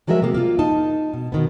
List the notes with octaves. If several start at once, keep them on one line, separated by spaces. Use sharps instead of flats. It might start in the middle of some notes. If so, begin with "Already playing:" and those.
F3 F#3 G#3 F#4 A#4 E5
C3 G#3 A#3
A#3 F4
D#4 A5
B2
B2 D#3 B3